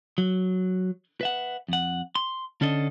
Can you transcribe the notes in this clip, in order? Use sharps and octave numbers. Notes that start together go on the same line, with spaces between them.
F#3
B4 E5 F#5
F2 F#5
C6
D3 C#4 D4 A4 D#5